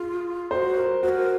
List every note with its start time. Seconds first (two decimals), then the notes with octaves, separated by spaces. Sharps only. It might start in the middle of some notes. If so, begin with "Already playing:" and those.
Already playing: F4 G#4
0.51 F#4 C5
0.77 A#4
1.03 F#4 C5
1.09 A#4